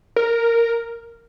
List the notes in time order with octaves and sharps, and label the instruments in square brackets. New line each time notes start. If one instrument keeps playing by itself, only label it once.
[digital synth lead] A#4